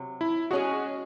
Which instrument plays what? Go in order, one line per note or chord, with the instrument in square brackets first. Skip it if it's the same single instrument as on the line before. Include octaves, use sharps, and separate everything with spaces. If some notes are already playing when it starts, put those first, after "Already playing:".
Already playing: [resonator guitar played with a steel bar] C3 F#3
[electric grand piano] E4
[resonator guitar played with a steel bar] G#3 C#4 G#4 [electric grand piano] F#4